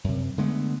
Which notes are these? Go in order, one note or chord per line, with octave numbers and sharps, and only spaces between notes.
F#2 C3
D3 G#3 A3 B3